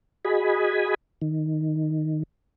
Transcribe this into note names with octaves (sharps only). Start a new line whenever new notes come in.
F#4 G#4 D#5 G#5 B5
D#3